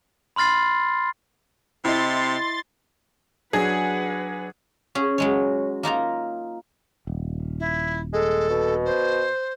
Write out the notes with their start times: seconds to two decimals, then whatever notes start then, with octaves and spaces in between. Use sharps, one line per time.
0.36 B5 C6 F6 A6 C7
1.85 C3 E4 D#5 C6 A6
3.53 F#3 D4 G#4 B4 F#5
4.95 C#4 G#4
5.18 F#3 G#3 C#5
5.83 A#3 D#4 F4 A#5
7.07 D#1
7.59 E4
8.13 G#3 A4
8.50 B2
8.85 C5